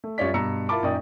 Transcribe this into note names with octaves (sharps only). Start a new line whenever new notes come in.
A3
F#2 G3 F4 C#5 D5 B6
G2 B2 A#5 E6 C#7
E4 F4 A#4 A5 B5 D6
F#2 A#2 D#4 D5 G5 D#6